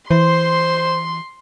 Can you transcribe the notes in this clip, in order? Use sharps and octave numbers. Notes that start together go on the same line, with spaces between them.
E3 C5 C6